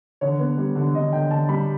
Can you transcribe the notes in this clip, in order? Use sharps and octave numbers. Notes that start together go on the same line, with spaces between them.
D3 C#5
B3
G3
D3
D3 D#5
D3 G5
D3 A5
G3 B5